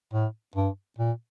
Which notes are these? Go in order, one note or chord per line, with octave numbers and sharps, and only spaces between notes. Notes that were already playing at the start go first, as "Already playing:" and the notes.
A2
G2
A#2